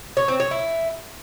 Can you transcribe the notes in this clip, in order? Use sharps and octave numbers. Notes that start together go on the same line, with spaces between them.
C#5
C4
C#5
E4